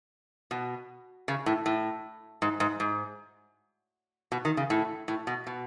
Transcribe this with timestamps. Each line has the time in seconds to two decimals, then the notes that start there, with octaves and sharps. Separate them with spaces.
0.51 B2
1.28 C#3
1.46 A2
1.66 A2
2.42 G#2
2.60 G#2
2.80 G#2
4.32 B2
4.45 D#3
4.57 C#3
4.70 A2
5.08 A2
5.27 B2
5.47 B2